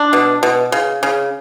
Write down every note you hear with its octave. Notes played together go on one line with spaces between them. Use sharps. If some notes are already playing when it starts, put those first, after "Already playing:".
Already playing: D4
B2
B2
C#3
C#3